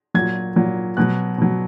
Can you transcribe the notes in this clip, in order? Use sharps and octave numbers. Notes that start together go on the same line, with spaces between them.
A#2 F#3 G#6
A#2 F#3
B2 F#3 F#6
B2 F#3